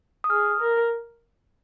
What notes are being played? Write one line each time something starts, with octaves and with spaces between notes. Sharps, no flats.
D#6
G#4 F6
A#4